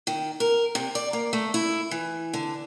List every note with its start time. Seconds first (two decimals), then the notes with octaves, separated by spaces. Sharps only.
0.07 D#3
0.40 A#4
0.75 C3
0.95 D5
1.13 A#3
1.33 A3
1.54 E4
1.91 E3
2.33 D3